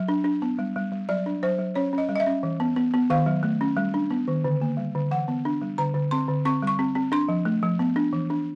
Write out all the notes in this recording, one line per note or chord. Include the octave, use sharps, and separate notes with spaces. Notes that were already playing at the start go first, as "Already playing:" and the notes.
Already playing: F#3
D4
D4
B3
G3
G3
G3
F#3 D5
D4
F#3 C5
F#3
C#4 C#5
C#4
D#5
G3
D#5
E5
C#4
E3
B3
B3
B3
D#3 F5
F#3
A3
C#4
G3
D4
B3
D#3
D3
A#3
G3
D3
E3 F#5
B3
D4
G3
D3 A#5
D3
C4 C6
D3
C4 C#6
G3 C#6
C4
C4
D4 C6
F3
A3
F3
B3
D4
E3
D4